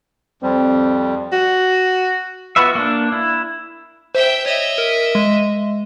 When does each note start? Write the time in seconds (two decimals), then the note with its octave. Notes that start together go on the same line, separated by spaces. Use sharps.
0.42 F2 G3 C4
1.32 F#4
2.56 B3 F4 F#4 B4 E5
2.75 A#3 D4
3.12 E4
4.15 C5 E5 G5
4.46 C#5 D#5 E5
4.78 A#4
5.15 G#3